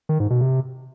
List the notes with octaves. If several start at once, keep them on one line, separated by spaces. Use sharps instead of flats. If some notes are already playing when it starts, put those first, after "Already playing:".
D#3
G#2
B2
C3